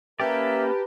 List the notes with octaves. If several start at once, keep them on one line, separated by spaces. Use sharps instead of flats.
A#3 C#4 G4 A#4 B4 D5 E5 A5